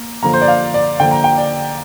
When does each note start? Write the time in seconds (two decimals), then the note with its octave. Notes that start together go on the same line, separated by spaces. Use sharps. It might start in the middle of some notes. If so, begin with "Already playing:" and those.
Already playing: A#3
0.23 D3 F3 A#3 A#5
0.33 C5
0.41 D5
0.48 F5
0.74 D5
1.00 D3 F3 A#3 G5
1.11 A#5
1.24 G5
1.37 D5